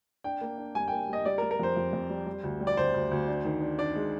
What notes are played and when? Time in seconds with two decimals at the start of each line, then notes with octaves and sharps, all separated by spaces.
0.24 D4 G5
0.41 A#3
0.58 D4
0.75 G3 G#5
0.88 G5
0.92 A#3
1.09 G3 D#5
1.25 G3 D5
1.38 A#4
1.42 G3
1.51 A#4
1.60 F2 C5
1.77 F2
1.93 F2
2.10 G3
2.27 G3
2.43 D2
2.61 G3
2.67 D5
2.77 D2 C5
2.94 D2
3.11 D2
3.28 D4
3.45 D#3
3.62 D4
3.78 D4 D5
3.95 G#3